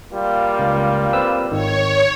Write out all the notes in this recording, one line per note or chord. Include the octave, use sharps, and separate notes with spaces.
G3 A#3 F4
C#2
C4 B4 E6
G#1 D#3 C#5